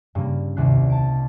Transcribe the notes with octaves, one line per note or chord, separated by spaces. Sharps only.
G2 C#3 A#3
D#1 C2 F#6 C7
A5 D7